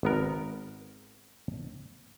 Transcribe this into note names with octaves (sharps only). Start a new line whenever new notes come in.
G#1 B3 A#4